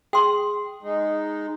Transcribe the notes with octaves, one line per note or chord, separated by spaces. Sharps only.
G#4 G5 C6
G#3 D#4